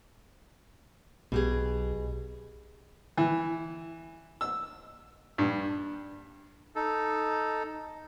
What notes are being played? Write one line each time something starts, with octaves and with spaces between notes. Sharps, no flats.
B1 B2 G4 G#4
E3
E6
G2
D#4 A4